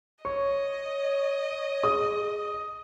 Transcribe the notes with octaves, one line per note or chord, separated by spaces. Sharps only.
C#5 D#5 C#6
G#4 D#6